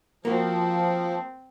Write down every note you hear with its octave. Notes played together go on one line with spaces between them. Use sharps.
F3 A#3 C4 F#4